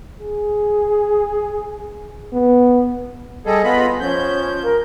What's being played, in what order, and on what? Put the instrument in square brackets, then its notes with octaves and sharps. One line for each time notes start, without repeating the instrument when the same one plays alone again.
[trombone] G#4
B3
[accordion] G3 G#4 A4 [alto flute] D#5
[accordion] B3 F4 B5
[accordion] F3 G6 [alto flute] C#4
[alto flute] A#4